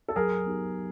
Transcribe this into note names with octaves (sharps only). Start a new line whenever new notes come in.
A4
F#3 G#4 A#4
B3 D#4 G4